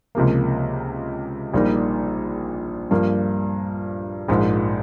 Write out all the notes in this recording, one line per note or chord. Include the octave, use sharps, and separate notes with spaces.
C#2 C3 F3 A#3
A#1 A#2 G3 A#3 D#4
G2 F3 A#3
A#1 G#2 F3 A#3